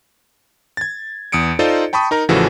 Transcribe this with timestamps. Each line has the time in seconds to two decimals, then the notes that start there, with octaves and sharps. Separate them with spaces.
0.77 G#6 A6
1.32 E2 D#6 C#7 D7
1.59 D#4 F4 A4 C5 D5 D#5
1.93 G5 A5 B5 C#6 D#6
2.11 D#4 A#4 A#5
2.29 A1 C#3 E3 F3 F#4 A4